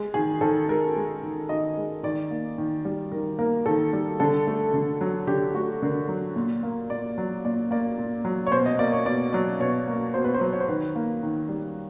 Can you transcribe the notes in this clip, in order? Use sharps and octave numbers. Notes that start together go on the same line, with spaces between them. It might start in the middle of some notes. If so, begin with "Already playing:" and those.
Already playing: G#3
D#3 G#4
D#3 A4
G#3 A#4
G#3
D#3
D#3 D#5
G#3
D#3 D5
A#3
D#3
G3
D#3 A#4
A#3 A#4
D#3 A4
G3
D3 A4
A3
D3
F#3
D3 G4
A3 F#4
D3 A#4
F#3
A#2
A#3
A#2 D5
F#3
A#2 D5
A#3 D5
A#2
F#3
C#5
B2 C5
D#5
A#3 D5
C#5
B2 D5
F#3 D5
B2 C#5
A#3
B2 C5
B4
C5
F#3
C#5
C5
D#3 B4
A#3
D#3
G3